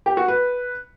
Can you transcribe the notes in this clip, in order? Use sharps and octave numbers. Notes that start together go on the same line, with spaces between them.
G4
F#4
B4